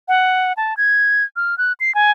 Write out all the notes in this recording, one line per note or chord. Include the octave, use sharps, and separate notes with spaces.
F#5
A5
G#6
F6
F#6
C7
G#5